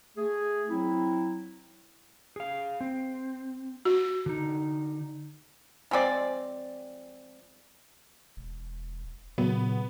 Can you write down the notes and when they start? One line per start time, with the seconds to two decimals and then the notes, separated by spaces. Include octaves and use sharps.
0.18 A3 G#4
0.70 F#3 C4 E4
2.36 G#4 F5
2.81 C4
3.85 F#4
4.26 D3 D#4
5.91 F3 G#3 C4 D5
8.37 E1
9.38 A#2 C#3 F#3 B3